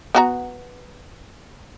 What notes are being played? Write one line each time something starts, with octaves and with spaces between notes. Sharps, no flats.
B3 F#4 A#5